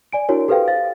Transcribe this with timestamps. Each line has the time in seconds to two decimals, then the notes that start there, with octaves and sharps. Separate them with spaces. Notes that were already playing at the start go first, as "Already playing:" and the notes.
0.12 D5 G#5 D7
0.29 D4 E4 F#4 A#4 C#5
0.48 G4 A4 B4 C5 F5 G5
0.68 C5 F5 A6